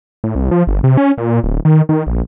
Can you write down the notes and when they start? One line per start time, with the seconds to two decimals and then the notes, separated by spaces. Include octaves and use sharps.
0.24 A2
0.35 C2
0.51 F3
0.67 G1
0.84 C3
0.97 C#4
1.18 A#2
1.44 D1
1.65 D#3
1.89 D#3
2.07 A#1